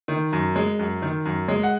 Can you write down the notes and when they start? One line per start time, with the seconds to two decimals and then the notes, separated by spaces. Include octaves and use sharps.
0.08 D#3
0.33 F#2
0.56 G#3
0.79 F#2
1.02 D#3
1.25 F#2
1.48 G#3
1.63 F#5